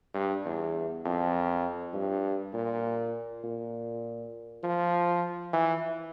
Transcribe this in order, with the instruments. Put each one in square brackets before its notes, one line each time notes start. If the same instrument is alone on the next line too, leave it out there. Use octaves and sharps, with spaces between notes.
[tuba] G2
E2
F2
G2
A#2
A#2
F3
E3